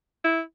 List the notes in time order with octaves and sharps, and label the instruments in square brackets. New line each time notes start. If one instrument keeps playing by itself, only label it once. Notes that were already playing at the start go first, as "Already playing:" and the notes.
[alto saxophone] E4